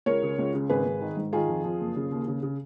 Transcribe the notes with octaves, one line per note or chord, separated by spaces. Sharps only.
C#2 A#4 C#5
C#3
C#2
C#3
G#1 G#4 B4
G#1
D#3
G#2
D#3 F4 G#4
F2
F2
F#1
C#3
D#2
C#3
C#3